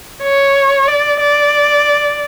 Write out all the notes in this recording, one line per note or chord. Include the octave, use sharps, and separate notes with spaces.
C#5
D5
D5